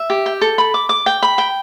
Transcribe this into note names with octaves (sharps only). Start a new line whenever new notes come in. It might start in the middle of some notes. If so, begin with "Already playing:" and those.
Already playing: E5
G4
G5
A4
B5
D6
D6
G5
B5
G5